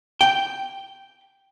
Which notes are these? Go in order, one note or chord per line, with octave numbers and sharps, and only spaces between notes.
G5